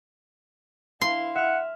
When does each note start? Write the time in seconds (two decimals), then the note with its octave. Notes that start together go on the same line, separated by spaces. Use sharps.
1.01 E4 F5 C6
1.35 E5 F#5 F6